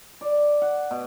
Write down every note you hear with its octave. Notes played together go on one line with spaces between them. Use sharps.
D5
F#5
B2